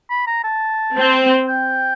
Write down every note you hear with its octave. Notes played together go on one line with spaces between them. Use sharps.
B5
A#5
A5
C4
G5